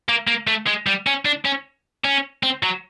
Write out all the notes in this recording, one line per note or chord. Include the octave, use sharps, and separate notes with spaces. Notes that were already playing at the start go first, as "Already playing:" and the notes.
A#3
A#3
A3
G#3
G3
C#4
D4
C#4
C#4
C4
F#3